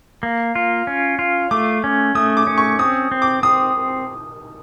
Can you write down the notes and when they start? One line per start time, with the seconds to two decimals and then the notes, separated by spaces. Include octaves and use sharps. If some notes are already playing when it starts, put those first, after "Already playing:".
0.23 A#3
0.55 F4
0.87 C#4
1.19 F4
1.51 A3 D6
1.84 C#4
2.15 A3 D#6
2.37 D6
2.47 C#4
2.58 C#6
2.79 C4 D#6
3.12 C4
3.22 D6
3.43 C4 D#6